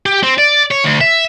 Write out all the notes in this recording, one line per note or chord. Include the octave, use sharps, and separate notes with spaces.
G4
C4
D5
C#5
D2
E5